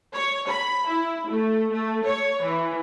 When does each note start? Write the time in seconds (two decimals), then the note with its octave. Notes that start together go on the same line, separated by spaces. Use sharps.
0.14 C#5
0.49 B5
0.89 E4
1.29 A3
1.72 A3
2.04 C#5
2.42 E3